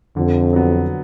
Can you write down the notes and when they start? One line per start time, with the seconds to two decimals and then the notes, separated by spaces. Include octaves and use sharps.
0.16 F2 D3
0.53 F#3 B3